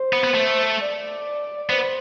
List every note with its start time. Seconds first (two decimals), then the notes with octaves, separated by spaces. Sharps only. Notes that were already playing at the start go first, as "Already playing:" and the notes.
Already playing: C5
0.13 B3
0.24 B3
0.35 A3
0.81 D5
1.70 B3 C5